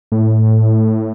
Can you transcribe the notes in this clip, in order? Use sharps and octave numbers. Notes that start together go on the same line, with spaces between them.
A2